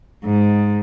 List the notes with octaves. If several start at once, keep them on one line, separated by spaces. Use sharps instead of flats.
G#2